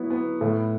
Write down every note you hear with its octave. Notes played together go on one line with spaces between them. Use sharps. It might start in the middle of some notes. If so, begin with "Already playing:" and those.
Already playing: F#3 B3 E4
B3
A2